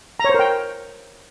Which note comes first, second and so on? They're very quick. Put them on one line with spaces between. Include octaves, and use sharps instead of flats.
A#5 C#5 C5 A#4 G5